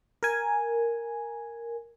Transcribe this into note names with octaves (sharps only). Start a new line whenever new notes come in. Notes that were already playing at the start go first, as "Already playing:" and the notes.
A#4 G#5